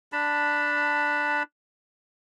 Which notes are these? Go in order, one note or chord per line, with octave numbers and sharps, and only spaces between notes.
D4 A5 B5